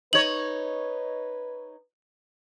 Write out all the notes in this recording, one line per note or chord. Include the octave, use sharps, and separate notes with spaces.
D#4 B4 C#5 F#7